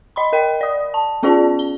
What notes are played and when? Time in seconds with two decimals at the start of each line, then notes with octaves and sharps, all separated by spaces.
0.16 D#5 B5 C6
0.33 A#4 D#5 G5
0.61 D5 D#6
0.94 A5
1.23 B3 C#4 F4 G#4 D5 A5
1.59 G7